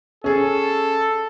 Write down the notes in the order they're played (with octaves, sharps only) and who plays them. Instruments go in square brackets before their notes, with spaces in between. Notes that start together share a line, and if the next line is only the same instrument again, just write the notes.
[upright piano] C#4 G#4 [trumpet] A4